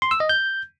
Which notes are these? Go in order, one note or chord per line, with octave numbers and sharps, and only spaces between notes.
C6
E6
D#5
G6